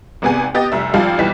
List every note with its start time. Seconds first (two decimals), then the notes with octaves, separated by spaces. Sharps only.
0.22 G#1 C3 B3 G#4 G#5
0.54 B3 G4 D#5 D#6 A6
0.72 F1 C2 E5 E6
0.94 G#1 F3 G3 F5 A5
1.19 B1 E3 G3 B6